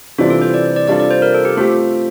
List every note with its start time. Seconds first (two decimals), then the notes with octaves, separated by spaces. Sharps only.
0.18 C3 E3 G3 D4 F4
0.30 A4
0.41 C5
0.54 D5
0.76 D5
0.88 C3 G3 D4 F4 A4 D5
1.00 D5
1.11 C5
1.22 A#4
1.34 A4
1.45 G4
1.57 A3 C4 F4 G4